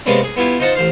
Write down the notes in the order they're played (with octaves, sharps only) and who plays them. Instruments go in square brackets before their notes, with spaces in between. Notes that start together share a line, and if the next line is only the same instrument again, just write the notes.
[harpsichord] C3 G#3 A#3 B3 C#4 D4
G#4
B3 E4 F4 G4 G#5
D#4 F4 C5 F#5 A5
A1 C5 F5